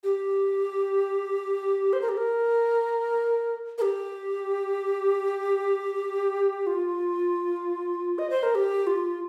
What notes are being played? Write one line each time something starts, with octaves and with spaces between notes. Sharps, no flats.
G4
C5
A#4
G4
A#4
A#4
G4
F4
D#5
C5
A#4
G4
F4